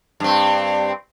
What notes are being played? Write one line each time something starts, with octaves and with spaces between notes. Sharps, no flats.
G2 C4